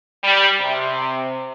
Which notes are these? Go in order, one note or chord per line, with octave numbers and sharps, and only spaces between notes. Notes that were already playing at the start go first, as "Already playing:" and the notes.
G3
C3